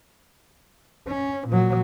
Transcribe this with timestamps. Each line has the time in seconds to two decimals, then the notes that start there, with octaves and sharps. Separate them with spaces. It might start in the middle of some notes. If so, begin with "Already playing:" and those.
1.08 C#4
1.48 A#2 F#3